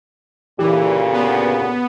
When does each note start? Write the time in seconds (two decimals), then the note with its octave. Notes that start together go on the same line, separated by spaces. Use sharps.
0.59 D2 A#2 C#3 E3 G4
1.13 B3